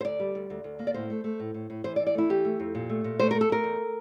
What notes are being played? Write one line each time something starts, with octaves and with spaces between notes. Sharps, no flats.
C5
D2 D5
G3
D2
D2
D2
A#3
D5
A2 C5
A3
A3
A2
A2
A2
E3 C5
D5
E3
D5
A3 E4
E3 G4
A3
F2
A#2
A3
A#2
A3 C5
A3 A#4
A4
A3 A#4
E2